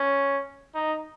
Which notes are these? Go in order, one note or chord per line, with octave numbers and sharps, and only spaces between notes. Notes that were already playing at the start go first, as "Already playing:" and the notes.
Already playing: C#4
D#4